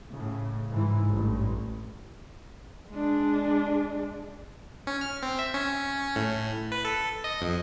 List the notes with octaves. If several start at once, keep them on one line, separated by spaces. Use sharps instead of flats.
A2 C#3
G#2 E3
A1 G2
G#3 D4
C#4
F6
C4
E5
C#4
A2
B4
A4
D#5
F2